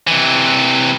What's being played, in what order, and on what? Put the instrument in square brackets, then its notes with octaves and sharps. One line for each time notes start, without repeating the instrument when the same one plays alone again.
[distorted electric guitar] C3 E3